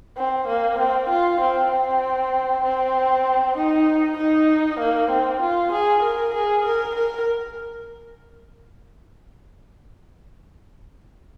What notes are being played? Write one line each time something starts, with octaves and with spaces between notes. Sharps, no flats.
C4
A#3
C4
F4
C4
C4
C4
D#4
D#4
A#3
C4
F4
G#4
A#4
G#4
A#4
A#4